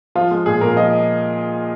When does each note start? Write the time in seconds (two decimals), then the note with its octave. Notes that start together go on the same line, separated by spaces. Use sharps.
0.15 F3 F4
0.31 G#3
0.46 A#2 G#4
0.61 A#2 A#4
0.76 F3 D#5